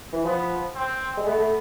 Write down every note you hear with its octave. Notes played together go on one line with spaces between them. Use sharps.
E3
F3 B3
C4
G#3
A3 B3
A3